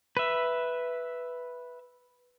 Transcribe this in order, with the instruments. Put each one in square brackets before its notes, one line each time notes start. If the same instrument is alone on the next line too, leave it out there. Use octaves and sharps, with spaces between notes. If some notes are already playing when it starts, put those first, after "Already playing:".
[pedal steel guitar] B4 E5